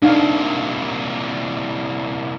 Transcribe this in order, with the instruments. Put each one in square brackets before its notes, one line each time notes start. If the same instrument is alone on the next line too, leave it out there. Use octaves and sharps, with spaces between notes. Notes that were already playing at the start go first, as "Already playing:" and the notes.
[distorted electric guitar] C2 A#2 [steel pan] D4 D#4 F5